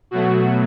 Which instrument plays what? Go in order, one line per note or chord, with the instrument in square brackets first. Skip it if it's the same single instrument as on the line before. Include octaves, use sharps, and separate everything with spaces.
[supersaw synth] B2 F#3 A3 F#4